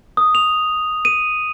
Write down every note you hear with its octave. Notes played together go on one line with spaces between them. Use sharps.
D#6
F7
D#7